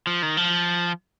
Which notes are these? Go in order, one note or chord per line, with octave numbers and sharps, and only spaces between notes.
F3
D#3
F3